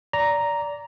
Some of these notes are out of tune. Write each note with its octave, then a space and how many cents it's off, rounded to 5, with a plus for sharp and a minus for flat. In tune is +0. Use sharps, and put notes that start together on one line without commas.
D5 -20 A#5 +0